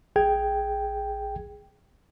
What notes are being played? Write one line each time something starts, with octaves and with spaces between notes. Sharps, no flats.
A1 G#4 G5 G#6